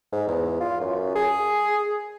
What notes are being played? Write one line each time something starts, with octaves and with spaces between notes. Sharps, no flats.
G#2
E2
F4
F#2
G#4